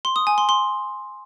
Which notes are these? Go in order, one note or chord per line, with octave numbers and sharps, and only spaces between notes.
C6
D#6
G#5
C6
C6